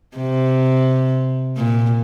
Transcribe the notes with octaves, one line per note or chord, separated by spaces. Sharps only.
C3
A#2